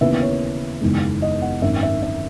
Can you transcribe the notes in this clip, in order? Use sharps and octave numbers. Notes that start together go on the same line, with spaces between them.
D#2 C#3 E3 B3 E5
C#5
F#1 E2 D#3 G#3
D#5
F#5
G#1 F#2 D#3 E5
E5
E5